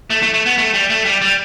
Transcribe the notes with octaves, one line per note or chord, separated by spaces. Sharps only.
A3
A3
A3
B3
A3
G3
A3
G3
G3